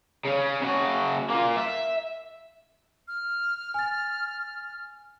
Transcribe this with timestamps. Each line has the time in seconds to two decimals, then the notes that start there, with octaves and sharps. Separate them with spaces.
0.25 C#3 C#4
0.62 C#3 F#4
1.30 A#3 F4
1.56 E5
3.08 F6
3.74 G#5 A6